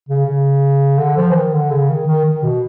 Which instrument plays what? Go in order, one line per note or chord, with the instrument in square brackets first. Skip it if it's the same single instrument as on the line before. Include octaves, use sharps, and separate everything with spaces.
[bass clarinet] C#3
C#3
D3
F3
E3
D#3
D3
C#3
D#3
D#3
D#3
B2